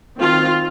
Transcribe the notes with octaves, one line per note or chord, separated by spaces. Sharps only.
D#3 C4 F4